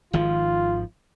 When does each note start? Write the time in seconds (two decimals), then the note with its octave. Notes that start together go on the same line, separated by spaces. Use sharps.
0.13 G#1 D#3 F3 F4